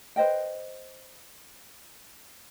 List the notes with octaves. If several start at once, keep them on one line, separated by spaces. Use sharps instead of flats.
B4 C5 D#5 G5